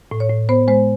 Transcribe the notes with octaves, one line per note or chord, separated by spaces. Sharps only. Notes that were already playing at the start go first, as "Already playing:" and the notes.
A2
C#5
A2
B3 C5
G#3 C5